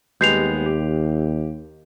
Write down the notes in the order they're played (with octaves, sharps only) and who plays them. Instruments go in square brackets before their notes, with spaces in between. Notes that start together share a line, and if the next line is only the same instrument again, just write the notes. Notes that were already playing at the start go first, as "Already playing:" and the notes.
[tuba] D#2 [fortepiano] G3 G#3 B3 [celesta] G6 C7 F7
[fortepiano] G4